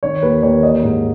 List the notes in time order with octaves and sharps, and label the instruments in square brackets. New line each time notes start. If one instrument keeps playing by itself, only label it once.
[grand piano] D#3 C#5
D#2 B4
D#2 C#5
E3 D#5
G#2